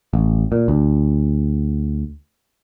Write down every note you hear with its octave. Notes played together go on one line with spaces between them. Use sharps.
A1
A#2
D2